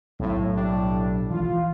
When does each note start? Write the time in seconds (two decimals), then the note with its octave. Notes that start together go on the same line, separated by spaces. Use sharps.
0.20 B1 A2
0.54 A2 G3 D4
1.31 E3 F3 F4